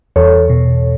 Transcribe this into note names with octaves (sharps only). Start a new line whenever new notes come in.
E2 A4 C#5
B2